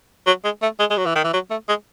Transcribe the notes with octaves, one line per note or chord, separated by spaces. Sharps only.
F#3
G#3
A3
G#3
G#3
F#3
E3
D#3
E3
F#3
A3
G#3